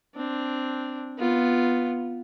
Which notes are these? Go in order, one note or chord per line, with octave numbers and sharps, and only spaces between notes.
C4 D4
B3 F4